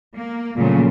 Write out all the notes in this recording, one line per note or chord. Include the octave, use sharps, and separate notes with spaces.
A#3
A#2 C#3 F3 F#3 A3 A#3